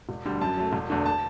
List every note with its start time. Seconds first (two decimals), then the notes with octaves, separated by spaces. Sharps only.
0.09 E1
0.25 D2 D3 G3
0.41 F#2 A5
0.57 F#3 A3
0.73 E1
0.90 E2 D3 A3
1.06 A5